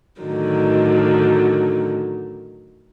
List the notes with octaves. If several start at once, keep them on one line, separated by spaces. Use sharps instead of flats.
A2 D3 D#3 F#3